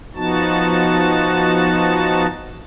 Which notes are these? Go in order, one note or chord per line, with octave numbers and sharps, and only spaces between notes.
F3 B3 D#4 F#4 A5